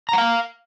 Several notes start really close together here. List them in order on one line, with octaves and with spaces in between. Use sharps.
A#5 F#5 F5